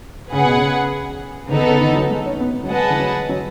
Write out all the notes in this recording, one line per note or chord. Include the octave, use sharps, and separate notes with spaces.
C#3 G#4 B4 F#5
B2
C#3
C#3
D#3 B3 D#4 A4
C#3
D#3
E3
F#3
G#3
C#4
B3
B3
F#3
G#3 G#4 B4 D#5 F#5 A5
E3
F#3
F#3